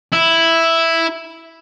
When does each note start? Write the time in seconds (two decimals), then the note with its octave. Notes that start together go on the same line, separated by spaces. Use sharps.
0.12 E4